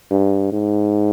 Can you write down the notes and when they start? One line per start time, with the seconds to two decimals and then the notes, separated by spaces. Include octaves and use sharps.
0.11 G2
0.53 G#2